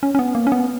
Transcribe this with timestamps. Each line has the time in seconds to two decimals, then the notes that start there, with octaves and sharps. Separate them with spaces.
0.03 C#4
0.15 C#4
0.19 B3
0.35 A#3
0.47 C#4
0.52 B3